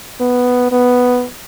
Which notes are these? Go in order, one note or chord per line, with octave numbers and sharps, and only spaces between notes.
B3
B3